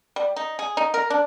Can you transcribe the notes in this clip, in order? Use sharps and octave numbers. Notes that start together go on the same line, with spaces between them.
G3
D#4
G#4
D#4
A#4
D4